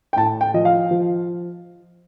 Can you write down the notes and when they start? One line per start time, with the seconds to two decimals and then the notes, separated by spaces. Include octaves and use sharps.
0.13 G5
0.16 A2 A5
0.41 G5
0.54 F3 D#5
0.65 F5
0.91 F3